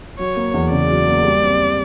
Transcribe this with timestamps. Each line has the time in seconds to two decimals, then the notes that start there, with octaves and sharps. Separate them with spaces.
0.19 F#3 C#5
0.36 A#3
0.54 E2
0.72 C#3 D5
0.90 F#3
1.07 A#3
1.25 G3
1.43 C4